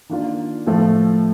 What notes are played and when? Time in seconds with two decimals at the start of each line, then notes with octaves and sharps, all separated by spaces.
0.09 D#3 A#3 D4 F4
0.66 A2 F3 A3